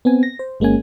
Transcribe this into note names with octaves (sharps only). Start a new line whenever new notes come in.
B3 C4 G#5
A#6
C5
G1 G#3 A#3 C#4 G#5